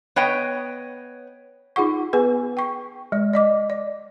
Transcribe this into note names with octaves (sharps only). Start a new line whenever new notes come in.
B3 C#5 D#5 G5
D#4 F4 G#4 F#5 C#6
B3 G#4 B4 G#5
G5 C#6
G#3 D5
D5 D#5 D6
D5